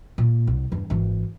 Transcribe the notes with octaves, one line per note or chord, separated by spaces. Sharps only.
A#2
C2
E2 G2
G#1 E3